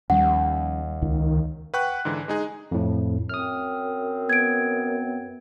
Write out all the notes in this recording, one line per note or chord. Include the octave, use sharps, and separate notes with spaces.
D#2 F3 G3 C#4 F#5
C#2 D#3
B4 F#5 G5 C#6 F#6
G#2 D3 E3
G#3 D#4 G#4
F2 A2
F#2 C4 D#6 F6
B3 G#6 D7